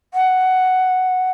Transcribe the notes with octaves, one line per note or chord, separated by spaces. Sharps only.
F#5